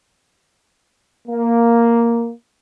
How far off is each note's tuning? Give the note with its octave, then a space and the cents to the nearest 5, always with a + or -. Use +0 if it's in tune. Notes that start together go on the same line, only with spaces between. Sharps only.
A#3 +0